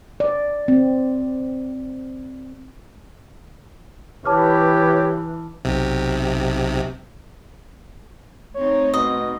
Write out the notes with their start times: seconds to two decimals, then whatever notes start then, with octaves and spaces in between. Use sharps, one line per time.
0.20 D5
0.68 C4
4.25 E3 G4 B4 C#5 A5 D6 F6
5.65 B1 C3
8.55 A3 C4 D#4 C#5
8.94 B2 D#5